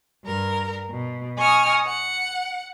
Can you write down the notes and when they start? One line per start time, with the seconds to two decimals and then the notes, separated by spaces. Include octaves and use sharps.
0.23 G2 A#4
0.90 B2
1.38 D#5 G#5 C#6 D#6 F6
1.87 F#5